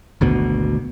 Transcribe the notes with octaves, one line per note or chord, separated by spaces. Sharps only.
G#1 D2 B2